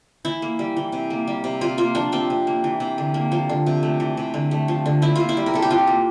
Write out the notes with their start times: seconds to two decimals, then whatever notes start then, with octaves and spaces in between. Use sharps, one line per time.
0.25 E3 E4
0.42 A#3
0.59 G3
0.77 E3
0.92 C3
1.10 A#3
1.27 G3
1.44 C3
1.61 C3 F4
1.78 A#3 F4
1.95 F3 D4
2.12 C3 C4
2.30 C3
2.47 A#3
2.64 E3
2.80 C3
2.98 D3
3.14 A#3
3.32 F3
3.49 D3
3.66 C3
3.83 A3
4.00 E3
4.17 C3
4.34 D3
4.51 A3
4.68 F3
4.86 D3
5.02 C3 E4
5.16 A#3 F4
5.29 E4
5.37 G3
5.46 A#4
5.54 C3 A4
5.62 G4
5.70 C3 F4
5.87 A#3